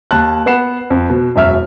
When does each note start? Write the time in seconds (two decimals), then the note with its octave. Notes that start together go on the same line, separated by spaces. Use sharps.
0.11 D#2 A5 F#6
0.46 B3 B4 F#5 F#6 C7 E7
0.90 F2
1.10 B2
1.36 E1 F#2 E5 F6